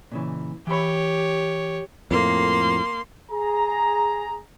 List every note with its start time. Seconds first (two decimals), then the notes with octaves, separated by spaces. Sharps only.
0.12 A#2 C#3 E3
0.67 E3 G4 C#5 B5
2.11 F2 A2 A#3 C6
3.32 G#4 A#5